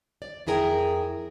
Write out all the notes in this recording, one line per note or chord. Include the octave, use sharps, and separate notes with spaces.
D5
F2 E4 G#4 A#4 G5